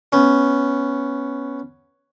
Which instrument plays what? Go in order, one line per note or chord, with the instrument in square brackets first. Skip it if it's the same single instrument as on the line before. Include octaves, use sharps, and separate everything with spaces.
[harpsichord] B3 C#4